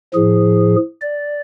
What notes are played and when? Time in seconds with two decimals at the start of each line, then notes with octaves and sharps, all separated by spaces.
0.14 A2 F3 G#4
1.02 D5